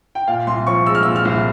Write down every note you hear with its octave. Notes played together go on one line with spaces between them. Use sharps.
G5
A#2 F5
C2 C6
F3 C#6
G#3 E6
F6
E6
A#2
F6
C2